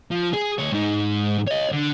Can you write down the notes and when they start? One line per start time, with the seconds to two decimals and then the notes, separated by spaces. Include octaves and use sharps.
0.11 F3
0.33 G#4
0.58 D2 C#5
0.72 G#2 D#4
1.48 C#5 D#5
1.72 D3